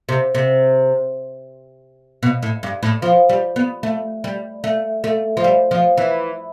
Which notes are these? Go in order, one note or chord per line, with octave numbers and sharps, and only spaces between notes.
C3
C3
B2
A2
G2
A2
F3
G3
B3
A3
G3
A3
A3
F3
G3
F3
E3